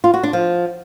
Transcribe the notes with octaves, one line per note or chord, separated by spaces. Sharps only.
F4
F#4
D4
F3